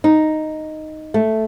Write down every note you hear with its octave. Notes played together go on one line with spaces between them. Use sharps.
D#4
A3